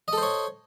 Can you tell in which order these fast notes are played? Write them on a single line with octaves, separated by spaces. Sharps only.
D#5 A4 C5 C#5